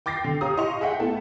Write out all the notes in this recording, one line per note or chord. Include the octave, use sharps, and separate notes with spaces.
G5 D6 A6 A#6 C7
D3
G4 C#5 F5 A#5 D#6
E4 D#5 F5 C6 C#6 F7
G#4 E5 F#5 G5
A3 B3 E4 A4